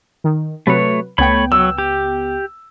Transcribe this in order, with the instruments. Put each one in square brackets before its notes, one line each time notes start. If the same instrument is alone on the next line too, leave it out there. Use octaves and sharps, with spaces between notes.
[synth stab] D#3
[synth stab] C3 F#3 B4 [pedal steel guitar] A3 C#5
[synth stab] C#2 B3 G5 [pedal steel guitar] A3 C#5 B5
[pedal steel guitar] F#3 [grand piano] E6
[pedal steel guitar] G4